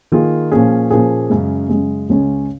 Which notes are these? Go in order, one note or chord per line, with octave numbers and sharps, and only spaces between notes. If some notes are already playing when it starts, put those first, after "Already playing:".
D#3 A#3 F4 G#4
A#2 F3 A#3 C#4 G#4
A#2 F3 A#3 C#4 G#4
F#2 C#3 G#3
F#2 C#3 G#3
C#2 C#3 G#3 C#4